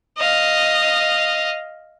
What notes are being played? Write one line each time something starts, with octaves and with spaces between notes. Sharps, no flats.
D#5 F5